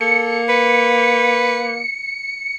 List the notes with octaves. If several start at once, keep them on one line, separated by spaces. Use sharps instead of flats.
A#3 A4 C#7
B4